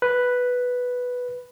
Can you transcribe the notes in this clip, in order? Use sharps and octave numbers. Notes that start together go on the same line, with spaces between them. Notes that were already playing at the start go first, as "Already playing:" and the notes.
B4